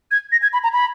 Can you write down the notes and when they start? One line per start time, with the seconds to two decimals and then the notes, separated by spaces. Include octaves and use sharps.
0.11 G#6
0.32 A#6
0.42 G#6
0.53 B5
0.63 A#5
0.73 B5